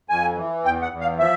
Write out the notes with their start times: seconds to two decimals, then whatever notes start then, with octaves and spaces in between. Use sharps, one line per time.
0.10 F2 G#5
0.37 E3
0.64 E2 G5
0.82 F#5
0.92 E2
1.01 F5
1.19 F3 E5